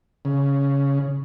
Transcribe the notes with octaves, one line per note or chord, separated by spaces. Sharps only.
C#3